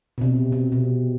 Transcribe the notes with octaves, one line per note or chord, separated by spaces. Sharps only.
B2
C3
C3
B2